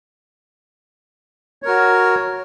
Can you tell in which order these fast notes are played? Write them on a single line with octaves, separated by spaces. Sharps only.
C#5 A#4 F#4